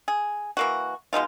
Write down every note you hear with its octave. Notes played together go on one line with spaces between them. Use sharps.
G#4
E3 A#3 F#4
B2 G#3 D#4 F4